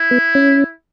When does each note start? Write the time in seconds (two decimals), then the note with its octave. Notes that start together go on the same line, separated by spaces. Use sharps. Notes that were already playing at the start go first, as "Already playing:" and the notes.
Already playing: E4
0.11 B3
0.35 C#4